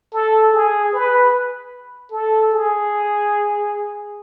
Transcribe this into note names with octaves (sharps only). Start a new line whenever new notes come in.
A4
G#4
B4
A4
G#4